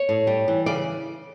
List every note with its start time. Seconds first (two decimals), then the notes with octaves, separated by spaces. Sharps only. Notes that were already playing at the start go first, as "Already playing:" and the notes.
Already playing: C#5
0.09 A2
0.27 G3
0.48 E3
0.66 C#3 D5